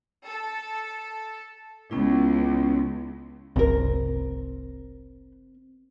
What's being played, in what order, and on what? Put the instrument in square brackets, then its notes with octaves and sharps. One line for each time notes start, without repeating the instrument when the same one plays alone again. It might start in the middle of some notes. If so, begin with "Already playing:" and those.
[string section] A4
[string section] C#2 [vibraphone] B3 C#4 E4
[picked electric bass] F#1 C2 [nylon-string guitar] C4 A#4